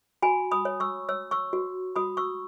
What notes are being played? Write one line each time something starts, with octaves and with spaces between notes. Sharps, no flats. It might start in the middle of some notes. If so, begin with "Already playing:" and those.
F#4 G#5 B5
B5 D#6
C#5
C#6 E6
C#5 E6
C#6 E6
F#4
F#4 B5 D#6
C#6 E6